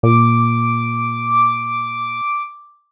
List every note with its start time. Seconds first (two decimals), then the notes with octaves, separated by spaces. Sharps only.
0.03 A#2 D6